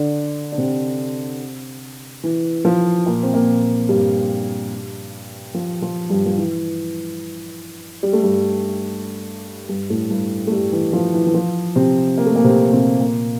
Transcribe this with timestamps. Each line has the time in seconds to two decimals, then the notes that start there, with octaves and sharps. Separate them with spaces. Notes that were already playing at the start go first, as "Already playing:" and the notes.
Already playing: D3 D4
0.52 D4
0.58 C3 C4
2.24 E3
2.65 F3
3.06 A#2 A#3
3.23 C4
3.34 A#2 A#3
3.89 G2 G3
5.54 F3
5.82 F3
6.10 G2 G3
6.26 F3
6.37 E3
8.03 G3
8.13 A3
8.23 G2 G3
9.69 G2 G3
9.90 A2 A3
10.10 G2 G3
10.47 A3
10.52 G2 G3
10.72 E3
10.93 F3
11.14 E3
11.27 E3
11.34 F3
11.76 C3 C4
12.18 A#3
12.26 A3
12.36 A#2 A#3
12.44 C3 C4
12.72 C3 C4
13.00 A#2 A#3